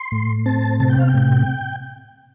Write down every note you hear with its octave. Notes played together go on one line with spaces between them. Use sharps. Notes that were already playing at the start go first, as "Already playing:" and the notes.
Already playing: C6
A2
C4 A5
C3 A5
G5
F5
G5
A2